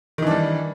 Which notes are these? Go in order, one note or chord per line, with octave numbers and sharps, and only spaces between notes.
D#3 E3 G3 D4